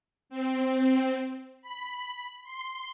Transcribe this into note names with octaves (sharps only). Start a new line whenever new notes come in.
C4
B5
C6